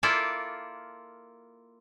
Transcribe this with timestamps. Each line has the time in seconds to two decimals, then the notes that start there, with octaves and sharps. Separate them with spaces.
0.03 A#3 E4 F4 A4 D5